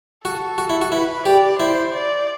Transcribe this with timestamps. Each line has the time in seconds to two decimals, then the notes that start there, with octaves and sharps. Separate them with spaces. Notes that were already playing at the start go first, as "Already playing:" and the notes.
0.25 F#4 A4
0.58 F#4
0.70 E4
0.81 F#4
0.92 E4 B4
1.26 G4 D5
1.59 E4 C5
1.93 D5